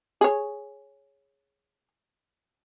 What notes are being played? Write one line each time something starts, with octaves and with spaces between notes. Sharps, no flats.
G#4 C#5